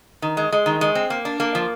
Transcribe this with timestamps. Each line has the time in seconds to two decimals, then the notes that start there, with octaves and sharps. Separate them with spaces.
0.22 D#3
0.37 G#3
0.52 G#3
0.66 D#3
0.81 G#3
0.95 C4
1.10 A#3
1.25 D4
1.40 A#3
1.55 F3